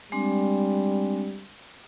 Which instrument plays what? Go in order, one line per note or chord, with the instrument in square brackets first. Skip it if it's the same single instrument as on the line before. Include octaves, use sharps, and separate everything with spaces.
[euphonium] G3 [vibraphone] G#3 C4 D4